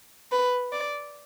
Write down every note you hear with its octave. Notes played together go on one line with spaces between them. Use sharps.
B4
D5